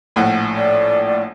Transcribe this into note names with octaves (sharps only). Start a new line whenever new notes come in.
A#1 A2 F#5
D5